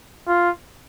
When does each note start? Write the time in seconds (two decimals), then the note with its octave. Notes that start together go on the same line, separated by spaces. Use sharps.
0.27 F4